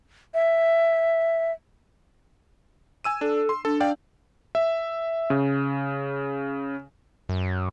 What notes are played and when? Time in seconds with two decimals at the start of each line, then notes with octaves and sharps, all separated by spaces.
0.34 E5
3.04 G#5 E6 D#7
3.21 D4 A4
3.49 C6
3.65 D4 A4
3.80 D5 F5 G5
4.55 E5
5.30 C#3
7.29 F#2